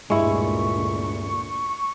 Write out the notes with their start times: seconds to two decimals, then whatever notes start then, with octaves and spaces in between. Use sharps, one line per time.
0.10 D2 G2 A#2 G#3 E4 C#6